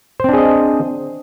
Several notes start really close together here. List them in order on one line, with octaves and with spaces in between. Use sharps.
C5 C4 D4 G#4 D#5